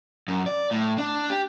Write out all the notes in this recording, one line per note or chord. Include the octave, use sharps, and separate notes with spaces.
F#2
D5
A2
D4
G4